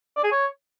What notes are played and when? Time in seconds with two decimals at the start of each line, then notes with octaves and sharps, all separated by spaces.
0.16 D5
0.24 G#4
0.32 C#5